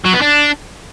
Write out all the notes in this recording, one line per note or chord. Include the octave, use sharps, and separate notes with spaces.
F#3
B3
D4